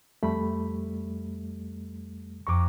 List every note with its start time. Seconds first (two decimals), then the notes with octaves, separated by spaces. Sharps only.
0.23 F2 G3 A3 B5
2.47 F2 A#5 C#6 D6